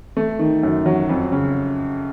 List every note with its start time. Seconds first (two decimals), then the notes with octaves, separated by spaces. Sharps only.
0.17 A3
0.39 D#3
0.63 F#2
0.86 F#3
1.09 F2
1.32 C#3